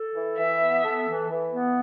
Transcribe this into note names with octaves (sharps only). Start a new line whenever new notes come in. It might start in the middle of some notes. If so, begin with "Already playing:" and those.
Already playing: A4
E3
E3 E5
B3
A4
E3
E3
B3